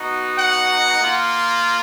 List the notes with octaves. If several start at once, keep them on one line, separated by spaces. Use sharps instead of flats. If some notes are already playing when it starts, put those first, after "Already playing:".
Already playing: B3 D#4 F#4
F#5
A#3 F4